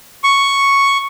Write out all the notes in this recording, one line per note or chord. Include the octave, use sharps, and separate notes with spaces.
C#6